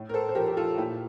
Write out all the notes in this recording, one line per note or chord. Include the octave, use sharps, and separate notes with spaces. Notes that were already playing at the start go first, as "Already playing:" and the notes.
Already playing: A2
A#4
A4 C5
C5
F3 G4 A#4
G4
F4 A4
A#2 E4 G4